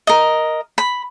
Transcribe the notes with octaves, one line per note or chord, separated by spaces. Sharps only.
A#4 D#5
B5